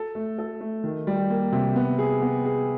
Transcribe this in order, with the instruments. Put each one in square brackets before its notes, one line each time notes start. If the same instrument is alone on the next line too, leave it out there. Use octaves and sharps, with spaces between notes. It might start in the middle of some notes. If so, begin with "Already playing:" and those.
Already playing: [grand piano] A4
A3
A4
A3
D#3
G3
A#3
C3
B3
G#4
B3
G#4